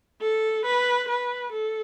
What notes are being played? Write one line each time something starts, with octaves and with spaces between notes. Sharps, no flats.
A4
B4
B4
A4